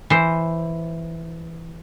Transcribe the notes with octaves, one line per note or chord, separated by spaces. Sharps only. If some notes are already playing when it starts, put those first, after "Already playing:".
E3 C5